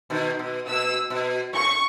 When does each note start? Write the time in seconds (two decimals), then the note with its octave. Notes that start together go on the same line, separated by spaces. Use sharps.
0.10 B2 D#3
0.39 B2
0.67 B2 E6
1.10 B2
1.53 A2 C#6